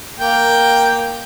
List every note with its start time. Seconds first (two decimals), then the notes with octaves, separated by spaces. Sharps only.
0.19 A#3 G5